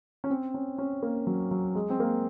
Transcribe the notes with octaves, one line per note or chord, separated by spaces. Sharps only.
C#4
C4
C#4
C#4
A#3
F#3
F#3
G#3
C4
A#3